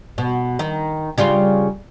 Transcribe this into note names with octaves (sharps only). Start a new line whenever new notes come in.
B2
D#3
C#3 G3 F4